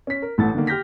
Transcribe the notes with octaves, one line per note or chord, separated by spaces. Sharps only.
C#4 B6
A#4
A1 A2 A4 F#5 A6
D3 D#3 A#3
G4 F6 G6 A#6 B6